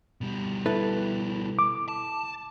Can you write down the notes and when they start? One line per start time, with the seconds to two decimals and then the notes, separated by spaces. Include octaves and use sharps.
0.21 B2 G3
0.66 E4 A4 B4
1.59 D6
1.88 A5